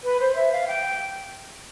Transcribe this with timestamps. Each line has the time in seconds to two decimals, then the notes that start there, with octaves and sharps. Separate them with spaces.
0.03 B4
0.20 C5
0.35 E5
0.52 F5
0.67 G5